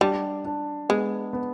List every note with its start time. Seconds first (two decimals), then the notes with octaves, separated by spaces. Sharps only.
0.01 G3 D4
0.45 D4
0.89 G#3 B3
1.33 B3